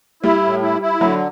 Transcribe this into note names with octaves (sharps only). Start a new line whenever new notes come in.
G3 E4
A2
E4
E4
D3 F#3